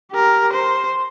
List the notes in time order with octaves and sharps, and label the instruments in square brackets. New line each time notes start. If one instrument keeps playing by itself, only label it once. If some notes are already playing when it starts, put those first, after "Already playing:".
[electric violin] G4 A#4
C5